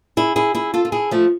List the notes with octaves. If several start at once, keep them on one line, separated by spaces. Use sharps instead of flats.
E4 G#4
E4 G#4
E4 G#4
F4 A4
F4
E4 G#4
F3 A3